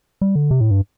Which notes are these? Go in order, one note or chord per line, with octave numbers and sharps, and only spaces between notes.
G3
D3
C3
A2
G2